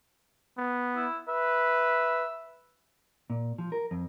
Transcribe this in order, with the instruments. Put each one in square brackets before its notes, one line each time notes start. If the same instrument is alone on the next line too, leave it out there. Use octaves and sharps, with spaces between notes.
[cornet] B3
[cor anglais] E4
[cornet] B4 [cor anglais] E5
[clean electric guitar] A#2
F3
A#4
F2